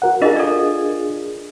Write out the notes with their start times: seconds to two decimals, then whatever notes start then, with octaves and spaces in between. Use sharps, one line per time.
0.02 F#4 A#4 F#5
0.22 D4 F4 G#4 A#4 D#5
0.36 A4 D5